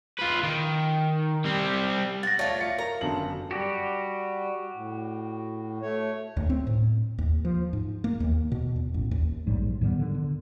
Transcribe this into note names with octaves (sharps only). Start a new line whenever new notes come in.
F4 B4
D#3
G3 C4
F#5 A6 A#6
A3 F4 C#5 D5 A5
F5 C#7
A#4 A#5
G1 F#2 A5 F#7
G3 F#4 G4
A2
A3 C#5
D2
C4
A2
D#2
F3
G#2
A#3
D#2
B2
E2
A1
D#2
A#1 G#2 F#3 G3
G#2 D#3 G3 B3
D3 D#3
D3